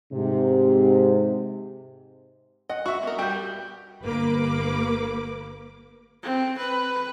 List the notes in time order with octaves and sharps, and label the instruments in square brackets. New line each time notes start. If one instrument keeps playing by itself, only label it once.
[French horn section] G#2 C3
[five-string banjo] D#5 [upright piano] F#5
[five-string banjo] F#4 [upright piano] E5 C#6
[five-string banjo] B3 A#4
[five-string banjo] G3 F#4 G4 [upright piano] G5 G6
[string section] G1 A#3 B4 D6
[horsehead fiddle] C4
B4